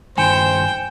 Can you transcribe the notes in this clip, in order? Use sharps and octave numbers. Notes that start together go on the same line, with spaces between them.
G2 D#3 C5 G5 G#5 C#7 E7